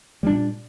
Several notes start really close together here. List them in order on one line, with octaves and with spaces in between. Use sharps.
G3 D4 A#2